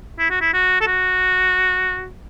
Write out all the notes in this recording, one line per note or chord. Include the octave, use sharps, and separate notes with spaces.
E4
F#4
E4
F#4
A4
F#4